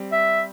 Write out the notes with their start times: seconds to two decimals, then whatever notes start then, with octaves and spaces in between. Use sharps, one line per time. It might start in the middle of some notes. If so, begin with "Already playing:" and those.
Already playing: G3 C4
0.12 E5